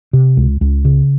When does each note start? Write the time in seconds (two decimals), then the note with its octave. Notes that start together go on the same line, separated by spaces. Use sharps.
0.13 C3
0.37 C#2
0.61 C#2
0.85 C#3